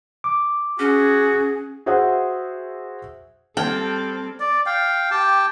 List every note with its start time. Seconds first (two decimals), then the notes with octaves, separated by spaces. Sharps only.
0.24 D6
0.79 C#4 F#4 G#4
1.86 F#4 G#4 C5 E5 F#5
3.57 G3 C4 A4 G5 A5 F6 G#6
4.39 D5
4.66 F5 G5
5.11 G4 G5 A5